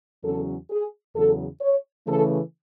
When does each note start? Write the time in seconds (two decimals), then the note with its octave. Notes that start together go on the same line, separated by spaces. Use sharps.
0.23 E2 C#3 F#3 C#4 A4
0.70 G#4
1.15 E2 C#3 F#3 A4
1.61 C#5
2.07 C#3 E3 A3 A4